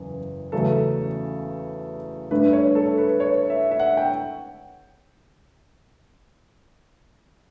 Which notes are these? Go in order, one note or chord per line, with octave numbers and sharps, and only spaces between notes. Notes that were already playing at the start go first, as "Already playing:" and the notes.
Already playing: F#1 E2
E2 C#3 F#3 A3 A4
G2 D3 A3 D4 B4
C#5
A4
B4
C#5
E5
E5
F#5
G5